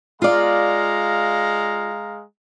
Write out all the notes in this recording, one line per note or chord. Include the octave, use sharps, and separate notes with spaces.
G#3 F4 D5 F5 A#5